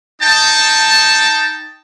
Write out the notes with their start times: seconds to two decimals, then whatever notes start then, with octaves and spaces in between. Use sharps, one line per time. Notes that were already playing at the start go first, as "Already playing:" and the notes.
0.21 D#4 G5 A5